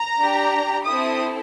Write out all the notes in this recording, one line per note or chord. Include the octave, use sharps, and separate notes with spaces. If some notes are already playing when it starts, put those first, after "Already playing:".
Already playing: A#5
D4 G4
C4 E4 A4 D#6